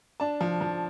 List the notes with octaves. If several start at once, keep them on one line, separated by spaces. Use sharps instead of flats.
D4 A5
F3
F3